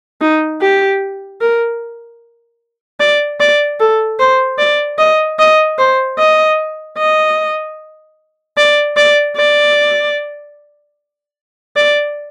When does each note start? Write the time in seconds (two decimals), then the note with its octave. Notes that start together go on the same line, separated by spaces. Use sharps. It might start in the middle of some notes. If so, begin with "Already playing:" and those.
0.21 D#4
0.61 G4
1.41 A#4
3.00 D5
3.40 D5
3.80 A4
4.19 C5
4.58 D5
4.98 D#5
5.39 D#5
5.78 C5
6.18 D#5
6.98 D#5
8.57 D5
8.96 D5
9.36 D5
11.76 D5